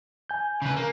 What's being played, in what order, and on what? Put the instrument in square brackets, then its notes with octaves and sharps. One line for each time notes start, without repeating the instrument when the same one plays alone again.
[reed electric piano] G#5 G6
[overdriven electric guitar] C#3 B4
A#3